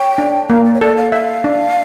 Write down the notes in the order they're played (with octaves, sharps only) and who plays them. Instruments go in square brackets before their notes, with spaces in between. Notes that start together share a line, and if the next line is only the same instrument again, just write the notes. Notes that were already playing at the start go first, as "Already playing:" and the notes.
Already playing: [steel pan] C#5 [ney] G5
[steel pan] D4
[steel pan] A#3 [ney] F5
[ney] D5
C#5
[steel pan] A4 [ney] D5
[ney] F5
[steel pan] E5 [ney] F5
[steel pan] D4